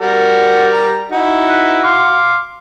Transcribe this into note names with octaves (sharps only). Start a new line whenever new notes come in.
G3 F#4 A#4 D5
A#5
D#4 E4 F#4
B4
F5 C6 D6